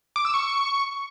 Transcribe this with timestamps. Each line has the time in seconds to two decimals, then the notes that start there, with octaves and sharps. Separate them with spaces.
0.16 D6
0.25 E6
0.34 C#6